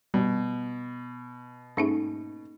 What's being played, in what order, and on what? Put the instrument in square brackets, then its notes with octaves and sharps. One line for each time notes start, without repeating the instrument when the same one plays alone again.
[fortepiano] B2 [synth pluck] G3
[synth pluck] G#2 A3 [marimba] A#3 C#4 D#4